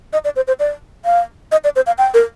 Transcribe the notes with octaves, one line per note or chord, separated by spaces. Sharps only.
D#5
D5
C5
C5
D5
F5
D#5
D5
C5
F5
G5
A#4